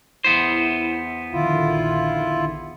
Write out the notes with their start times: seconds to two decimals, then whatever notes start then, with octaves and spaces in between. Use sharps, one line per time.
0.24 E2 B3 E4 C5
1.32 A#1 D3 D#3 E4 F4